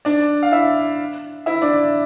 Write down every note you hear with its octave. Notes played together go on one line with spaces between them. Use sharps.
D4 D5
F5
E4 E5
E4 E5
D4 D5